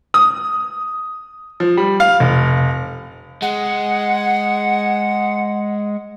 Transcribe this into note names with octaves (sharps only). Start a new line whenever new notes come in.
D#6
F3
G3
F5
F1
G#3 F#5